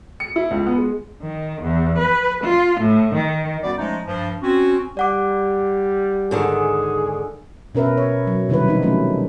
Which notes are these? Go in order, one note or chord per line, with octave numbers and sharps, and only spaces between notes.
C#7
E4
C#2
B3
G#3
D#3
E2
B4
F4
A2
D#3
F#2 G3 B3 F#4 D5
F3 G#3 A3 C#4 D#4
G2 F3
C4 C#4 F#4
G3 D5 F#5 D6
G#2 D3 D#3 G#4
B2 C#4 A#4 B4 E5
C#5
F#3
C3 D#3 G3 E4 B4
F3 C4 D#4
F#3 A3 C#4 E4